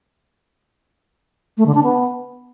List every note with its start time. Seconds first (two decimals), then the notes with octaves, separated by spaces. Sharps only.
1.57 A3
1.66 D3
1.75 D4
1.83 B3